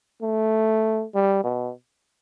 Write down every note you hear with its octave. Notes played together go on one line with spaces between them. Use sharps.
A3
G3
B2